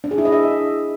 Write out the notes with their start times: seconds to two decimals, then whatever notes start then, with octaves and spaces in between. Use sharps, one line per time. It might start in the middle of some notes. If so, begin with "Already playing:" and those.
0.04 D4
0.11 G#4
0.18 E4
0.25 D#5
0.32 E5